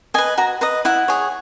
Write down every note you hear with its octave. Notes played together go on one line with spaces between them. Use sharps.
B4 D#5 G#5
F#4 A#5
B4 D#5 A#5
E4 F#5
G#4 C#5